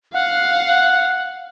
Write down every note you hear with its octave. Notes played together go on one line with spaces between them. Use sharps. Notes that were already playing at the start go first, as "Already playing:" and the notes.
F5 F#5